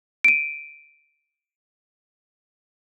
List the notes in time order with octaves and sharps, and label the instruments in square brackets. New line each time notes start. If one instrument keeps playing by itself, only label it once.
[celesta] D7 D#7